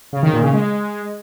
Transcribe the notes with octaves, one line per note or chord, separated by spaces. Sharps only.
C#3
D#3
A#2
C#3
G#3